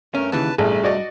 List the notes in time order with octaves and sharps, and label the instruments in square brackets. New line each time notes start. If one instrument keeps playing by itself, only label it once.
[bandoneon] G2 A3 A#4 [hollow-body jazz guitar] C#4
[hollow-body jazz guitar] D#2 C#3 E3 [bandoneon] B4 A5
[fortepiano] A1 [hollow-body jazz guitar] G2 [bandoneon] C3 A3 [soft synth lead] G#4
[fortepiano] F#4 D5 D#5